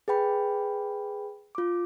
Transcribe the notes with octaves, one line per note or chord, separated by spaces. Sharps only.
G#4 B4 G5 B5
F4 D6